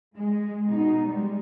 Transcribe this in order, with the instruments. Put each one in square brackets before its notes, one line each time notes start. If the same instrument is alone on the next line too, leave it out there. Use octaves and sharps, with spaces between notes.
[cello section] G#3
B2 D#4
G3 G#3